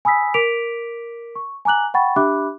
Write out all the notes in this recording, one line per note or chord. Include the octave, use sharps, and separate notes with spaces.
G#5 B5 D#6 E6 B6
A#4 D6 B6 D7 F7
C#6
G#5 A#5 D6 F#6 F#7
F#5 G5 B5 C#6 A6
D4 G4 E5 B5 D6 F#6